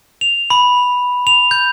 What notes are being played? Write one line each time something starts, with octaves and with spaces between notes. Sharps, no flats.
F7
B5
F7
G6